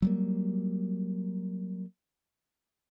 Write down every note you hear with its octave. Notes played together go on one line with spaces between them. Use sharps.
F#3 G3 A#3